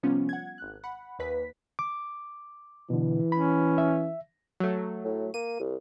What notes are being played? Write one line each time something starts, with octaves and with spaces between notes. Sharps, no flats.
C3 F3 G3 B3 C#4 F4
F#5 G#6
G#1 F#6
F#5 B5
D#2 B4 B6
D6
B2 D3 E3
C#4 B5
E5
F#3 A3
A2
A#3 D#7
C2